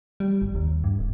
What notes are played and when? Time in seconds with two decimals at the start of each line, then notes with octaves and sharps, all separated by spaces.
0.20 G3
0.42 G1
0.55 D#2
0.84 G2
0.99 D1